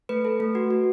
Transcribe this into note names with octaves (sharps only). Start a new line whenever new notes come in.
A3 B4
A4
A3
F#4
F#4